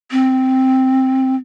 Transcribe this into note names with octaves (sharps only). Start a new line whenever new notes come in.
C4